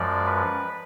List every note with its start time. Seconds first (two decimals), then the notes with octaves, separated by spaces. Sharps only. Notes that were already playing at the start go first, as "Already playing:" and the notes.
Already playing: F#2 F3 G#3 D5
0.26 B4